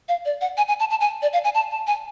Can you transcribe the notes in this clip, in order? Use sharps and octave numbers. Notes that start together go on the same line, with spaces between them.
F5
D5
F#5
G#5
G#5
A5
A5
G#5
D5
F5
G#5
A5
A5
G#5